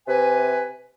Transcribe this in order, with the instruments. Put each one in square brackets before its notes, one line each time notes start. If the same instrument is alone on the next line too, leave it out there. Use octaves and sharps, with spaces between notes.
[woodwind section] C3 B4 G#5